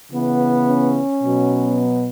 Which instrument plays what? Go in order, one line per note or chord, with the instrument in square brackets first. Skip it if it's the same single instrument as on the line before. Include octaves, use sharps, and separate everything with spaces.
[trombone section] C#3 E3 B3
C#4
B2 F#3 B3